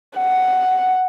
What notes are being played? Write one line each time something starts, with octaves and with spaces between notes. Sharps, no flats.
F#5